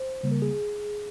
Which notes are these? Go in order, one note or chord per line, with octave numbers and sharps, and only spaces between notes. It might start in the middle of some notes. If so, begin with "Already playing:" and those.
Already playing: C5
C#3 G3 A#3
A#4
G#4